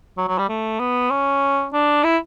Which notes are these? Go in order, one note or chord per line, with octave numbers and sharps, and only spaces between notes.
F#3
F#3
G3
A3
B3
C#4
D4
E4